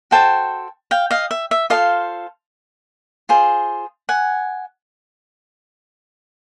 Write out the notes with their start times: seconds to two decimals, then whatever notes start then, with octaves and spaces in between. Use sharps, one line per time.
0.11 F#4 A4 C5 G5 A5
0.91 F5 G5
1.11 D#5 F5
1.31 E5
1.51 E5
1.70 F4 A4 C5 D#5 F5
3.29 F4 G#4 C5
4.09 F#5 G#5